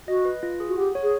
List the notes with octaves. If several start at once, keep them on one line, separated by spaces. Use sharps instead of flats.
F#4 D#5
B4
F4
G#4
F#4
G4 F#5
C#5
G#4